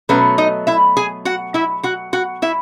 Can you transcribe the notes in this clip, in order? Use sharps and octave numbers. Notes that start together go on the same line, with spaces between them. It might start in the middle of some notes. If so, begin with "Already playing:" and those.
B2 F#3 A3 B3 C#4 B4
D#4 D#5
E4 E5
G#4 G#5
F#4 F#5
E4 E5
F#4 F#5
F#4 F#5
E4 E5